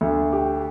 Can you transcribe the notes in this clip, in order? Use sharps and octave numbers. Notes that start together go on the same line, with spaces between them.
D2
G4